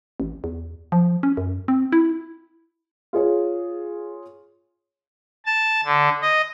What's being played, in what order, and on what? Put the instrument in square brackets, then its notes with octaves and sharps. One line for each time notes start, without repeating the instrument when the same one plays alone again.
[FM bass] A1
E2
F3
C#4
F#2
C4
E4
[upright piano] F4 G#4 C#5
[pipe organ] A5
D3
D#5